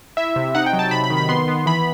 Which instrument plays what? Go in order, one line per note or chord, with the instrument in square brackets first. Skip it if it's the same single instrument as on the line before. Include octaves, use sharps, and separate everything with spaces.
[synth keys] E4 E5
C3
D#4 F#5
G5
F#3
A5
C3 B5
B5
D#3
B5
B3 C6
B3
E3 B5